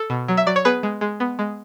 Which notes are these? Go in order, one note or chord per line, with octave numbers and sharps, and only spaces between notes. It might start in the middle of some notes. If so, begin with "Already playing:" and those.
Already playing: A4
B2
F#3
E5
F#3 D5
C#5
B3 G#4 B4
G#3
G#3
B3
G#3